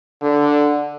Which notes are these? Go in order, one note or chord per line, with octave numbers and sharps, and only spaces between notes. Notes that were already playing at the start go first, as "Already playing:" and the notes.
D3